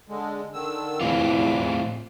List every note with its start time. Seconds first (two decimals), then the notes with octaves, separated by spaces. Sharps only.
0.09 D3 G#3
0.54 D3 D#3 E6
1.01 E2 A2 E3 C4 F4 D6